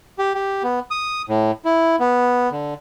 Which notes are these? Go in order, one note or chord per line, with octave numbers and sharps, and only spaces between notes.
G4
G4
B3
D#6
A2
E4
B3
D3